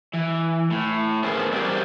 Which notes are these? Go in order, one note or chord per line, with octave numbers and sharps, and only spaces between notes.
E3
A2
B3 C#4 G#4 A#4 C5
F#3 G3 G4 A#4 C5 D5